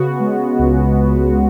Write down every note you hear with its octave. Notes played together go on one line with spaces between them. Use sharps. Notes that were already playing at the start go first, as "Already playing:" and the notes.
Already playing: C#3 B3 F#4
G#3
C#2
B3